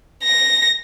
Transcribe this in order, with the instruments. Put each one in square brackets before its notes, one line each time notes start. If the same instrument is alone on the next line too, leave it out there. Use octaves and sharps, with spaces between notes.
[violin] A#6